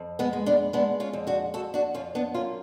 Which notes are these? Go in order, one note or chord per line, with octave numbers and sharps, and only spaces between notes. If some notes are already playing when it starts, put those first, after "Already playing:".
Already playing: F2
G#3 B3
G#3
B3 D4
G#3 B3 D4
C#4 F4
F2
D4 F#4
F2 F#4 A4
D4 F#4
F2 C#4 F4
B3 D4
F#2 C#4 F4